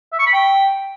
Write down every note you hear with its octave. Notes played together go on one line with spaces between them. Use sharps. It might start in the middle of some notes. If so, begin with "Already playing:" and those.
E5
C#6
B5
G5